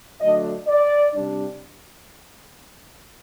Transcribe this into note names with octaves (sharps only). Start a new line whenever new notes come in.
D3 F#3 A3 D4 D#5
D5
C3 G3 D4